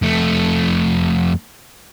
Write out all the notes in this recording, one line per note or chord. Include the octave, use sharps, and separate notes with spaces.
F2 A3